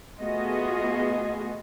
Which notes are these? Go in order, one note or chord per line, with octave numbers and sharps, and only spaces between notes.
A3 B3 F4 F#4 G#4 D#5